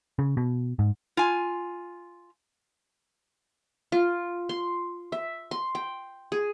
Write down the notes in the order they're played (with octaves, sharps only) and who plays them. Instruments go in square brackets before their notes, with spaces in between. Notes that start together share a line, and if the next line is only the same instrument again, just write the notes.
[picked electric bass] C#3
B2
G#2
[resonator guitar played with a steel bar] F4 G#5
[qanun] F4
C6
E5
C6
G5
G#4